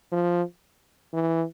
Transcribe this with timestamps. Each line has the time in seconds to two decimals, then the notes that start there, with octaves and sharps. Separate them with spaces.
0.12 F3
1.13 E3